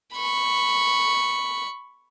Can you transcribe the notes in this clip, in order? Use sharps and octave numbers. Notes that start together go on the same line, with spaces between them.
B5 C#6